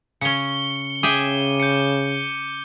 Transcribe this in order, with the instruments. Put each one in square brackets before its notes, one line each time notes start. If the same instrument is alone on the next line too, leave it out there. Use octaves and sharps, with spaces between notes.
[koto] C#3 C#4 [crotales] C#7 G7
[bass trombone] C#3 [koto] G#4 E5 G5 [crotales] D6 D#7 G7
[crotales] G6 C#7